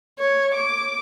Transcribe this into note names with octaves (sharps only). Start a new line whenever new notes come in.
C#5
D6